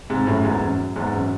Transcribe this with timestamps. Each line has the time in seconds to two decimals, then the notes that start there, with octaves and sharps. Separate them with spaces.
0.10 G#2 C3
0.27 F#2 A2
0.44 E2 G#2
0.61 F#2
0.96 E2 G#2
1.13 F#2